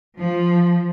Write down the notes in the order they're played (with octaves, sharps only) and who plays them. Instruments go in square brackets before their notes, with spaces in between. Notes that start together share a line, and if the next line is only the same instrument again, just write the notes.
[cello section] F3